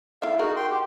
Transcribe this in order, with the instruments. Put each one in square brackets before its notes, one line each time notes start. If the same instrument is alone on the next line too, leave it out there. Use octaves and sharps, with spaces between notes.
[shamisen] E4 A4 E5 [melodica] F5
[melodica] D#4 F#4 [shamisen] G#4 A#4
[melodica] G5 C6
G4